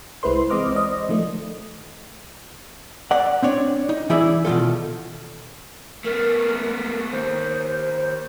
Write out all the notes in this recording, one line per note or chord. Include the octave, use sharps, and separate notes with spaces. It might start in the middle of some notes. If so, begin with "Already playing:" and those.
C2 G#3 E4 B4 C5 C6
E3 G#3 C4 D#5 D6 F6
C5 D5 D#5
D#3 F3 A3
D5 F#5
C4 D4 C#5 D5
D#4
E3 D#4 E4 G#4 D5 E5
B2 D#3 F#3 F4 A4
A3 B3 A#4
D#2 C5